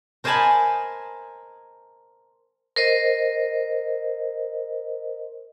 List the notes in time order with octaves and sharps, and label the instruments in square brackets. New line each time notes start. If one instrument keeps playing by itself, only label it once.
[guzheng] A#4 C5 D#5 G#5 A5 B5
[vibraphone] A#4 C5 D#5